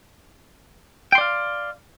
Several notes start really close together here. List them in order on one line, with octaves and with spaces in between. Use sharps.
G5 C6 D5 F5